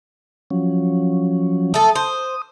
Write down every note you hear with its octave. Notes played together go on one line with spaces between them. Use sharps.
F3 F#3 C#4
A3 A4 D#6
C5